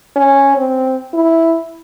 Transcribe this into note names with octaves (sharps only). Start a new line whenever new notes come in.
C#4
C4
E4